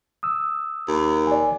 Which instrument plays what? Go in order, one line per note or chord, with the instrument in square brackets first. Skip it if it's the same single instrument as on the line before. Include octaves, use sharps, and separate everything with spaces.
[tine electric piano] D#6 E6
[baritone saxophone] D#2
[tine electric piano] D5 G#5